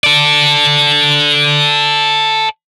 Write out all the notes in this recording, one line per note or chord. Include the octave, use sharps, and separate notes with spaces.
A4 D5